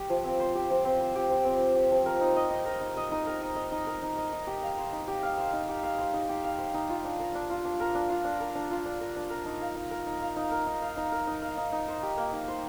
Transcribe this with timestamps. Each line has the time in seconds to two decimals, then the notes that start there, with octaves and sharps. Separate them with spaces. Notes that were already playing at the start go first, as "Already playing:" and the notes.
Already playing: G4 C5
0.10 F3
0.24 C4
0.40 C5
0.55 G4
0.70 F3
0.85 C4
1.01 C5
1.15 G4
1.30 F3
1.45 C4
1.60 C5
1.75 G4
1.91 F3
2.06 A#4
2.21 D#4
2.36 D#5
2.51 D#4
2.66 A#4
2.81 D#4
2.97 D#5
3.11 D#4
3.27 A#4
3.42 D#4
3.56 D#5
3.72 D#4
3.87 A#4
4.03 D#4
4.17 D#5
4.32 D#4
4.47 G4
4.62 F5
4.78 C5
4.93 D#4
5.08 G4
5.23 F5
5.38 C5
5.53 D#4
5.69 G4
5.83 F5
5.99 C5
6.14 D#4
6.29 G4
6.44 F5
6.59 C5
6.74 D#4
6.89 F4
7.05 D4
7.19 A#4
7.35 D4
7.50 F4
7.65 D4
7.80 A#4
7.95 D4
8.10 F4
8.24 D4
8.40 A#4
8.55 D4
8.71 F4
8.86 D4
9.01 A#4
9.16 D4
9.30 A#4
9.46 D#4
9.61 F5
9.76 D#4
9.91 A#4
10.06 D#4
10.22 F5
10.36 D#4
10.51 A#4
10.66 D#4
10.82 F5
10.97 D#4
11.12 A#4
11.27 D#4
11.42 F5
11.57 D#4
11.72 D#4
11.88 C5
12.03 G4
12.18 A#3
12.33 D#4
12.48 C5